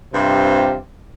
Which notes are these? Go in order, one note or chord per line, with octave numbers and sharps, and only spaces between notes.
G2 C3 C4 F4 G4